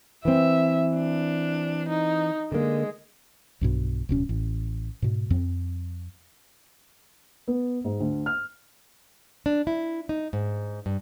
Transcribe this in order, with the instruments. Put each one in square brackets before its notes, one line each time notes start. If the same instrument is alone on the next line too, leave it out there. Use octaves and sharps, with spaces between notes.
[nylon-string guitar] E3 C4 [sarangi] E5
[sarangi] D4
D#4
[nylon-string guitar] D3 A#3 [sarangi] G#3
[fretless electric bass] B1 G2 B2
D1 B2 C#4
A1
G#2 B2
F2 C4
[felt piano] B3
G#2
D2
F6
[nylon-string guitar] D4
E4
D#4
G#2
G2